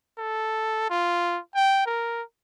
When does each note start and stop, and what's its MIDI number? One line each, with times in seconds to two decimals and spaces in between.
0.19 0.89 69
0.90 1.40 65
1.55 1.82 79
1.86 2.22 70